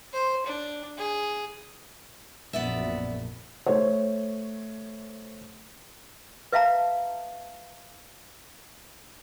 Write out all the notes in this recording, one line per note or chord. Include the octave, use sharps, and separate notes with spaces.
C5
D4
G#4
A#1 F#2 A#2 B3 D5 E5
A3 C5 C#5
B4 E5 F5 A5 A#5